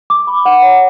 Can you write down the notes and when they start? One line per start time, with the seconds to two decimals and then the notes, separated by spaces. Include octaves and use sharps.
0.10 D6
0.27 B5
0.45 F#5
0.62 C#5